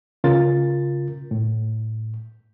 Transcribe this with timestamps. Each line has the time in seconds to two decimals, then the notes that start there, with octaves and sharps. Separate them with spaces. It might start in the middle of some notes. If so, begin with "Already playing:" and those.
0.24 C#3 F4 A#4 A6
1.31 A2